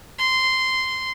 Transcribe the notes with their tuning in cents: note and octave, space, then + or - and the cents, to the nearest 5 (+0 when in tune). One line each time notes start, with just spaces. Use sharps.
C6 -10